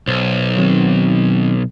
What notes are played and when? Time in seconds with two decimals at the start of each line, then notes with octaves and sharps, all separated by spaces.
0.08 B1 C5
0.57 D#3 F#3 C4